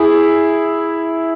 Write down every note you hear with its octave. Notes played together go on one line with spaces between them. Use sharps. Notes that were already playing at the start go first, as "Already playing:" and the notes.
Already playing: E4 G#4